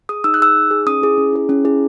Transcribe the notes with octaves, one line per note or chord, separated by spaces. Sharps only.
G#4 D#6
D#4 E6
F#6
G#4 E6
D#4
G#4
C#4 D#6
E4 G#4
C#4
E4 G#4
C#4
E4 G#4